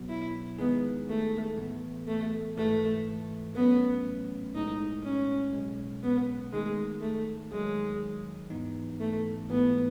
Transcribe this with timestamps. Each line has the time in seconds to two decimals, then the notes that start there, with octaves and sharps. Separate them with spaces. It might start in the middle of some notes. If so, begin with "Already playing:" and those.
Already playing: B1 B2 F#3 B3
0.09 E4
0.59 D#2 D#3 G#3 B3 D#4 G#4
1.09 A3
1.57 A2 E3 B3
2.07 A3
2.57 A1 G#2 E3 A3
3.55 A1 A2 F#3 A3 B3 C#4
4.54 B1 A2 G#3 D#4
5.04 C#4
5.53 B1 B2 G#3
6.03 B3
6.53 D#3 G#3 A3 D#4
7.01 A3
7.51 D#2 D#3 F#3 G#3
8.50 G#2 E3 B3 D#4
9.00 A3
9.49 A1 G#2 E3 A3 B3